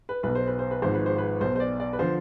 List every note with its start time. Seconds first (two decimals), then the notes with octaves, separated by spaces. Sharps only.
0.09 B4
0.23 B1 B2 B4
0.35 C5
0.47 B4
0.59 C5
0.71 B4
0.82 G#1 G#2 F3 C5
0.94 B4
1.06 C5
1.18 B4
1.41 B1 B2 C5
1.56 C5
1.60 D5
1.80 D5
1.93 B4
1.99 D3 F3 C5